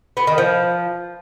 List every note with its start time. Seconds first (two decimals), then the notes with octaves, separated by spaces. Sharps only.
0.17 B3
0.27 D#3
0.38 F3